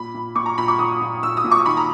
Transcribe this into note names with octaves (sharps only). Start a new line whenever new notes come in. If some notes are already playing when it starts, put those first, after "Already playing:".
Already playing: A#2 B5
A#2
A#2 C#6
A#5
A#2 B5
C#6
A#2 D#6
A#2
A#2 E6
D#6
A#2
C#6
D#3 B5
A#5